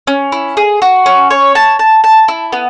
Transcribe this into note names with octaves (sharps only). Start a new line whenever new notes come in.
C#4
E4
G#4
F#4
C#4
C#5
A5
A5
A5
E4
B3